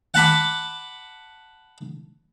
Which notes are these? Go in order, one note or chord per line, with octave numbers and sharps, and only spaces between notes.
F#5 A5 B5 D6